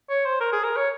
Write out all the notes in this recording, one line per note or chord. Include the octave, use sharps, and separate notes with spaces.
C#5
C5
A#4
G#4
A#4
C#5